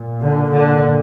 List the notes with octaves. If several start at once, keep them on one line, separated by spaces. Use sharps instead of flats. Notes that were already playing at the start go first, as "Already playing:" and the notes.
Already playing: A#2
D3
D3